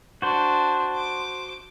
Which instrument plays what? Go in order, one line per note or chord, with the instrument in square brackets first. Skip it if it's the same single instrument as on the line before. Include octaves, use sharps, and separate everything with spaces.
[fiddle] D4 [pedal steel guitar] F#4 C5
[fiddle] D6